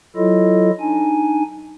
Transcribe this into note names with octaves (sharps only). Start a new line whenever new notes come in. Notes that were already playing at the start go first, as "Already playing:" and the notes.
F#3 E4 F4 A4 D#5
D4 D#4 G#5